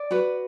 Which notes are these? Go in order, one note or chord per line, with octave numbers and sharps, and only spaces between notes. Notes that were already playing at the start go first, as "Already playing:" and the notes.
Already playing: D5
F#4 B4